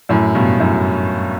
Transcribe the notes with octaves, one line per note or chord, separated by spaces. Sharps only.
F#2 A2
G2 B2
F#2 A2